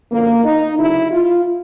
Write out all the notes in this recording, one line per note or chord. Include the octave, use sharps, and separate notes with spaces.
F#2 D3 F3 A#3
D#4
D2 C#3 F#3 E4
F4